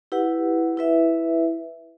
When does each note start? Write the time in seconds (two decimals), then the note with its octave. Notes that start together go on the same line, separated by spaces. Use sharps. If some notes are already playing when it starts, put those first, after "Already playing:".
0.12 E4 G4 B4 F#5
0.77 E4 B4 E5